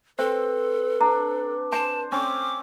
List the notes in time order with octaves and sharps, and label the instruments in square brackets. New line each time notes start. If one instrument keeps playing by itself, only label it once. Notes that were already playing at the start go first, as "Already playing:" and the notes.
[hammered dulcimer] C4 [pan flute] A4 [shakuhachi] B4 [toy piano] C5
[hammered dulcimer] D4 [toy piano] A#5
[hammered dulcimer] C5 [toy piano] G#5 [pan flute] A5
[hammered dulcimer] C4 C#4 [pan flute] D6